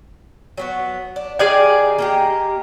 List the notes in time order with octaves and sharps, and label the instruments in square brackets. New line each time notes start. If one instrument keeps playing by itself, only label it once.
[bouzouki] F#3 B3 F#4
D4
[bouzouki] D#3 A#3 G4 [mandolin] G#4 D5 G#5
[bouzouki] A#3 D#4 G4